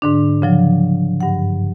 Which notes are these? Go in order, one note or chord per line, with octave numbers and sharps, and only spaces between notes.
G#2 D3 D4
C#3 F3 F#3
G2 F#5